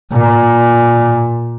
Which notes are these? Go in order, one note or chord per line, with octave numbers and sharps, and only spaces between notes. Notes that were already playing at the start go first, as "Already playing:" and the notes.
A#2